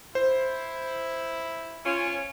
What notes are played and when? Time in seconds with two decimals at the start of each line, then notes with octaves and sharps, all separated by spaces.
0.15 E4 C5
1.86 C#4 F4 C#5